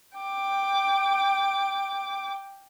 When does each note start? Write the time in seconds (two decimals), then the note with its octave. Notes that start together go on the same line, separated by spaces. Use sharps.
0.18 G5 D6